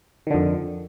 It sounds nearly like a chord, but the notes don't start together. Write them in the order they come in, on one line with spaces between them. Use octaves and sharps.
D#3 D3 F2